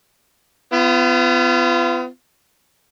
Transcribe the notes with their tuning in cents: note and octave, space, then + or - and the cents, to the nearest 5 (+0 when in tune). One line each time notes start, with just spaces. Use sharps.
B3 +35 F4 -30